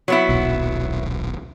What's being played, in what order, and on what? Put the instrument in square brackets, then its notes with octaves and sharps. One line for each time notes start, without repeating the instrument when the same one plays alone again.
[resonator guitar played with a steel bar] F#3 B3 E4
[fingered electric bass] D#1 B1